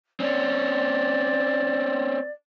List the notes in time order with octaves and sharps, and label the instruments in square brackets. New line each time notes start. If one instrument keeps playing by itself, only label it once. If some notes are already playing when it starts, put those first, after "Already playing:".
[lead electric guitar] C4 C#4 [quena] D5